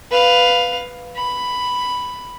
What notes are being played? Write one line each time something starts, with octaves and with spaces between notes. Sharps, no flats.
B4 F5
B5